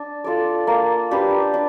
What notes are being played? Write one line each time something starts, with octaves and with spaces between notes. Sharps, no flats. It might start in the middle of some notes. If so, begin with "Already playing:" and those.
Already playing: D4
F4 A4 D5
A#3
D4 G4 B4
D4